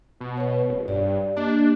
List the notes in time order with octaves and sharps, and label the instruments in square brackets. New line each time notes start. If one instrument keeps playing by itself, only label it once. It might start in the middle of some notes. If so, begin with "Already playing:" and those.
[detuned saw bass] B2
[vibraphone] B4 C#5
[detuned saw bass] D#1
[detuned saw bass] G2 [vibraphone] G4 D5
[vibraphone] A#3 G4 D#5 [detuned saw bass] D4